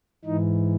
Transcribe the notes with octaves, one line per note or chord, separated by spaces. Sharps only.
G#2 E3 D#4